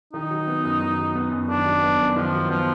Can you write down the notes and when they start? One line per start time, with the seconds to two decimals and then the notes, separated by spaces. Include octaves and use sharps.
0.13 D#3 D#4
0.30 F#3
0.48 B3
0.64 F#2
0.80 D#3
0.99 F#3
1.15 B3
1.31 F#2
1.48 D#3 D4
1.66 F#3
1.82 B3
1.99 F#2
2.16 D#3 F3
2.33 F#3
2.49 F3 B3